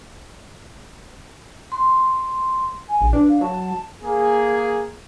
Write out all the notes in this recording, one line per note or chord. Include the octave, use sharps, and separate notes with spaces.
C6
G#5
A#1
D4 B4
F5
F#3 A5
A#3 G#4